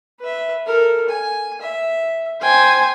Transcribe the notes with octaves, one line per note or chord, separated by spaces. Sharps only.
B4 E5
A4 A#4
G#5
E5
C5 G5 G#5